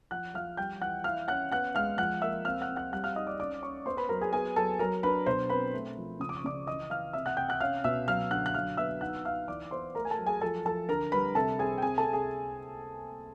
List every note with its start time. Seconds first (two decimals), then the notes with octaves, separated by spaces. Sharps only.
0.11 F3 F#5 F#6
0.34 F3 F5 F6
0.57 G3 G5 G6
0.81 E3 F#5 F#6
1.04 E4 F5 F6
1.28 C#4 F#5 F#6
1.52 B3 F#5 F#6
1.75 G#3 F5 F6
1.98 F3 F#5 F#6
2.21 A#3 E5 E6
2.45 C4 F5 F6
2.61 F#5 F#6
2.68 C4
2.76 F#5 F#6
2.92 G3 F#5 F#6
3.04 F5 F6
3.16 D#4 D#5 D#6
3.27 D5 D6
3.39 C#4 D5 D6
3.62 C#4 C#5 C#6
3.86 B3 C5 C6
3.97 B4 B5
4.09 F#3 A#4 A#5
4.21 G#4 G#5
4.33 B3 G#4 G#5
4.56 F#3 A4 A5
4.79 F#3 A#4 A#5
5.03 D4 B4 B5
5.26 B2 C5 C6
5.49 C4 B4 B5
5.74 A3
5.97 F3
6.20 C#3 D#6
6.29 D6
6.37 C#6
6.44 C#3 D5 D6
6.67 E3 D#5 D#6
6.90 E3 F5 F6
7.13 C3 E5 E6
7.26 F#5 F#6
7.37 C3 G5 G6
7.49 F#5 F#6
7.60 C#4 F5 F6
7.84 B2 E5 E6
8.07 F#3 F5 F6
8.31 D3 F#5 F#6
8.46 F#6
8.54 F#3 F5 F6
8.77 B3 E5 E6
9.01 D#4 F#5 F#6
9.25 D#4 F5 F6
9.48 E3 D5 D6
9.71 B3 C5 C6
9.95 A3 A#4 A#5
10.05 G#5
10.10 A4 A5
10.18 F#3
10.26 G#4 G#5
10.41 F3 A4 A5
10.65 F3 A4 A5
10.89 D3 A#4 A#5
11.12 G3 B4 B5
11.35 C3 A4 A5
11.59 C4 G#4 G#5
11.78 G5
11.82 C3 G#4 G#5
11.98 A4 A5
12.06 C3
12.13 G#4 G#5